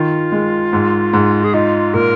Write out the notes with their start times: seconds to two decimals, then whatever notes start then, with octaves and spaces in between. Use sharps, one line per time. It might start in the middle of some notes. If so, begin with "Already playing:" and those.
Already playing: D#3 F4
0.32 G#3
0.73 G#2
1.13 G#2
1.44 G#4
1.54 D#4 F4
1.94 A#2 A#4